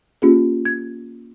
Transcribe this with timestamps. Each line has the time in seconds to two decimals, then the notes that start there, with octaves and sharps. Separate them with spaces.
0.22 A#3 C#4 F4 G4 G#4
0.65 G#6